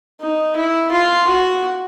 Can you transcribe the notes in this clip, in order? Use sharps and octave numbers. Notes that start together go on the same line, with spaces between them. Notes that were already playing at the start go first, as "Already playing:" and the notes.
D#4
E4
F4
F#4